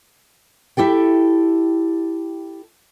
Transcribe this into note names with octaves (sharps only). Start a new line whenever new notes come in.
E4 G4 A4 G5